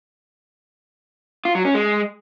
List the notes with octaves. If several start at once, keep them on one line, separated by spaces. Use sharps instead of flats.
F4
F#3
C#4
G#3